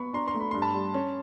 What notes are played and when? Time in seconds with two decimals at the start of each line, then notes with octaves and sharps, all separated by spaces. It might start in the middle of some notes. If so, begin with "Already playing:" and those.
Already playing: B3 B5 C#6
0.13 D4 A#5 C6
0.27 A#5 C6
0.35 A3
0.40 B5
0.51 G2 C6
0.62 A5 B5
0.74 G3
0.94 C#4